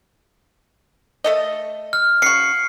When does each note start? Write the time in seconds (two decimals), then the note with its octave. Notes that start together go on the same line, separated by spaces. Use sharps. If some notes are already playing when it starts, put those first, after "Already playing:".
1.24 A3 A4 D#5
1.93 F6
2.22 C#3 F#4 C7 C#7